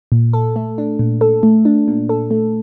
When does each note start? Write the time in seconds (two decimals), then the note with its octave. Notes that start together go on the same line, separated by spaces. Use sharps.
0.12 A#2
0.33 A4
0.56 A3
0.78 D4
0.99 A#2
1.21 A4
1.43 A3
1.65 D4
1.88 A#2
2.09 A4
2.31 A3